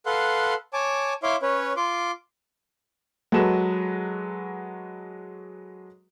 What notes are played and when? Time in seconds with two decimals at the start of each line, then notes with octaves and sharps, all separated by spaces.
0.06 A4 B4 F5 F#5 C6
0.73 C#5 G#5 A5 D6
1.23 E4 C#5 E5 F5 C6 D6
1.42 C#4 B4 C#5
1.77 F4 C6 D6
3.32 F#3 G#3 F#4 A4 B4 E7